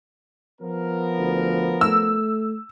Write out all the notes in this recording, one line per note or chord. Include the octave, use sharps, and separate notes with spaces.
F3 B3 A#4
D2
A3 E6